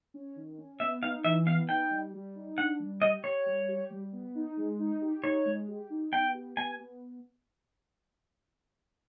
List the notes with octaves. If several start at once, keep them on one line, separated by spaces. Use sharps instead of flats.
C#4
D#3
C#4
B3 E5
D#4 F5
E3 E5
B3 F5
D#4 G5
G3
G3
D#4
D4 F#5
G3
G4 D#5
G4 C#5
G3
G4
G3
B3
D#4
G#3
D#4
G4
D#4 C#5
G#3
G4
D#4
B3 G5
G4
B3 G#5
B3